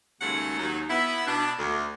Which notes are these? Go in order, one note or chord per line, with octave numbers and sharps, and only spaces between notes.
D#2 C#3 F#3 G#3 A3 F#5
D#2 F#3 D#4
B3 E4 E5
B2 D4
D2